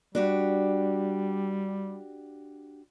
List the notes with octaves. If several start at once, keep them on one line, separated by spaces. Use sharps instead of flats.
G3 D4 F#4 G4